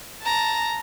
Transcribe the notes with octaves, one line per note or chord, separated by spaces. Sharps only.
A5 A#5